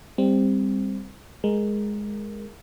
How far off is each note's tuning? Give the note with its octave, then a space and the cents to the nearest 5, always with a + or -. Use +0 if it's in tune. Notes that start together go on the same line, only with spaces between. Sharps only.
G3 +25 C4 +0
G#3 +0 A#4 +0